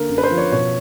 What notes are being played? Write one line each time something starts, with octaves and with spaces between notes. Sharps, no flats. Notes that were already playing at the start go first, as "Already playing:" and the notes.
Already playing: D3 A#3 A#4
F#2
B4
C5
F3
C#5
B2 C#5